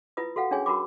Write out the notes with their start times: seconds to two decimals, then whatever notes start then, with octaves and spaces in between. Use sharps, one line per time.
0.17 E4 F4 B4 D#6
0.36 F#4 A4 F5 F#5
0.51 C#4 D4 G#4 C#5 G#5
0.66 F#4 A#4 B5 D6